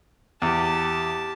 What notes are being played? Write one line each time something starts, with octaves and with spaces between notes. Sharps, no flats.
E2 G4 A5